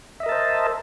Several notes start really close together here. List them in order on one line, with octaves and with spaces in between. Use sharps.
E5 D#5 A#4 A5 C5